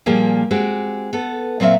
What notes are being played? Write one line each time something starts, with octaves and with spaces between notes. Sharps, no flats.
A#2 F3 G3 A#3 G4 G#4
G#3 C4 F#4 G4
B3 A4
A#2 F#3 C4 C5 E5 F5